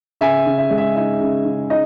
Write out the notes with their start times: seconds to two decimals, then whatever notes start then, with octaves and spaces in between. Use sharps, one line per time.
0.21 C#3 E5 G#5
0.46 C#3
0.58 E5
0.70 G#3
0.78 E5
0.96 D#4 E5
1.20 C#3
1.45 C#3
1.70 D#4 D#5